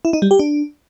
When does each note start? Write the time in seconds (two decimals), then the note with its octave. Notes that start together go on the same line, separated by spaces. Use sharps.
0.05 E4
0.13 D#4
0.22 G3
0.31 G4
0.39 D4